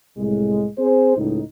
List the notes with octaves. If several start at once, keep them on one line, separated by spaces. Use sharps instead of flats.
C2 A2 G#3
C4 G#4 C5
C#2 A2 D#4